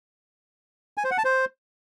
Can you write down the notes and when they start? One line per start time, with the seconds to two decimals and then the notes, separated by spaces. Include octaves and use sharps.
0.97 G#5
1.04 C5
1.11 F#5
1.18 A5
1.25 C5